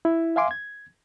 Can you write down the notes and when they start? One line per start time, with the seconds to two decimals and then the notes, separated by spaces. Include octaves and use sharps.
0.05 E4
0.36 E5 F5 G#5 C6 D6
0.51 G#6